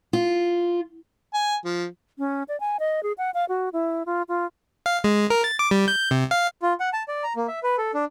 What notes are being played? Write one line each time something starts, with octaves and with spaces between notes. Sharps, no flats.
F4
G#5
F3
C#4
D5
G#5
D#5
G#4
F#5
F5
F#4
E4
F4
F4
F5
G#3
A#4
A6
D6
G3
G6
C3
F5
F4
F#5
A5
D5
A#5
A#3
E5
B4
A4
D4